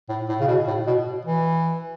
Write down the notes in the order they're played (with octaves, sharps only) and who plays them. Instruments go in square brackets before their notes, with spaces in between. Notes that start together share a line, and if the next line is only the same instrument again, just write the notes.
[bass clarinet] A2
A2
C#3
B2
A2
B2
E3